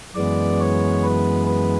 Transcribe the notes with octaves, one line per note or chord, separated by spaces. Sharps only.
F#2 E3 G#3 B3 D5
C#5
B4
B4